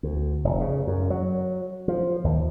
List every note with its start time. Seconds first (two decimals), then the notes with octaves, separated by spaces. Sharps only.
0.03 D2
0.44 F1
0.61 C#3
0.87 F#2
1.10 F#3
1.88 F3
2.24 D#2